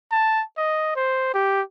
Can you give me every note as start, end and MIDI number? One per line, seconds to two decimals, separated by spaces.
0.12 0.43 81
0.57 0.93 75
0.96 1.29 72
1.34 1.61 67